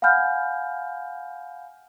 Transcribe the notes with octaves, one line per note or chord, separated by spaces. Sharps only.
F5 F#5 G#5 B5 F6 G6